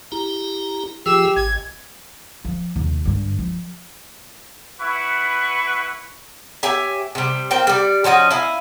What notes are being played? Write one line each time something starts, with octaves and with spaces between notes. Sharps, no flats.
E4 G4 A#5
F3 F4 G4 G#4 E6
G#1 G#6
F3
D#2 C3
G2 D3
F3
E4 B4 F#5 C#6
G4 C#5 E5 G#5
C3 G3
A#3 C4 F4 G5
G3 D5
F3 C#4 F#4 D#5
E4 F5 G#5